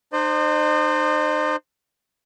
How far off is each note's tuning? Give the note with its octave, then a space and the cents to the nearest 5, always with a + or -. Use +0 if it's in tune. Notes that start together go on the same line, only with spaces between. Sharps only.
D#4 -40 C5 +0 D#5 -45